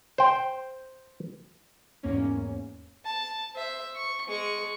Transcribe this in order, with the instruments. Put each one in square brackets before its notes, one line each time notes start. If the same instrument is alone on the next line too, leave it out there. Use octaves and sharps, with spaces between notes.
[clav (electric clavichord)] C5 G5
[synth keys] E2 G#2 A#3 C#4
[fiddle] A5
C5 E5
C#6
G#3 C#6